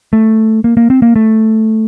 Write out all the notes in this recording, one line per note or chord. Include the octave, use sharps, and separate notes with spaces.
A3
A#3
A#3
C4
A#3
A3